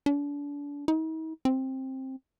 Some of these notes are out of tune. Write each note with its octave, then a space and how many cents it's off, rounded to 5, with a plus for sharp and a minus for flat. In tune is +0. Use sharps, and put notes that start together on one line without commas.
D4 -35
D#4 +45
C4 +15